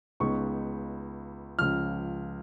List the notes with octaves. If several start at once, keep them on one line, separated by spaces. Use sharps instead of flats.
C#2 C#3 G#3 B3 D#4 C#6
C#2 C#3 F3 F6